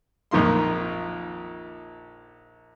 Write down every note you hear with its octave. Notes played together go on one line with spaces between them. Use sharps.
A#1 F2 D#3 A#3 C6